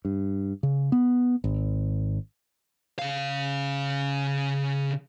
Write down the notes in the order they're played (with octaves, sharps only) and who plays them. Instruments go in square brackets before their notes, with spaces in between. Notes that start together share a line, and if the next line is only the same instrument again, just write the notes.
[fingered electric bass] G2
C#3
B3
G#1
[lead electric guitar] C#3 F5